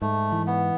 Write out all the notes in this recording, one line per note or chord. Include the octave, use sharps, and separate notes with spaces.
G#2 A3
E3
B3